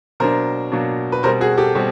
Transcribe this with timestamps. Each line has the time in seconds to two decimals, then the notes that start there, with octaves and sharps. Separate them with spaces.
0.20 B2 F#3 A#3 D4 A#4 C5
0.72 B2 F#3 A#3 D4
1.12 B4
1.23 B2 G3 C4 A#4 C5
1.41 F#4 G#4
1.58 G4 A4
1.75 B2 G3 C4